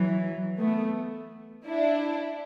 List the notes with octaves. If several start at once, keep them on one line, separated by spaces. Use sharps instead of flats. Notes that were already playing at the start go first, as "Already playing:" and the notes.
Already playing: E3 F#3
A3 B3
D4 E4